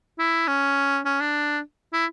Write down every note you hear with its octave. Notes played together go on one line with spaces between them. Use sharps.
E4
C#4
C#4
D4
E4